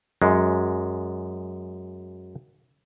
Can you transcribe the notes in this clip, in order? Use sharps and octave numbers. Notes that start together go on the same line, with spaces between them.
F#2 G#3